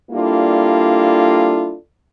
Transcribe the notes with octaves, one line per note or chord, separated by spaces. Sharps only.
G3 A#3 D4 E4 F4 A4